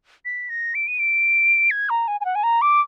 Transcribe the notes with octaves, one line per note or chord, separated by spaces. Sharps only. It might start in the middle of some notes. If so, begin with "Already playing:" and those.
B6
A#6
D7
D#7
D7
G#6
A#5
G#5
G#5
F#5
G#5
A#5
D6